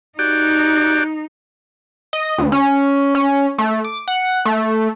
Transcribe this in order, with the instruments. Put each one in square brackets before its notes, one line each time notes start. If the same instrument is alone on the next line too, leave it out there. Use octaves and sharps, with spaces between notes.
[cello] D#4 [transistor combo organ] F#4 G4 D5
[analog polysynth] D#5
D2
C#4
C#4
A3
D6
F#5
A3